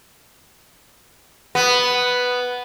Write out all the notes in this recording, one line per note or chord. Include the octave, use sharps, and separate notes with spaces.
B3